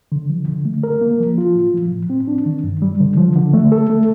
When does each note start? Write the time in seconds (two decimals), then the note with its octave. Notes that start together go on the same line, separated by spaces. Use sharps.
0.12 D3
0.30 F3
0.48 D3
0.65 A3
0.83 A#4
1.01 A#3
1.20 F3
1.38 F4
1.56 A2
1.74 F3
1.92 A2
2.10 C4
2.27 D4
2.46 D#3
2.64 G2
2.82 G3
3.00 D3
3.17 F3
3.36 D3
3.53 A3
3.72 A4
3.90 A3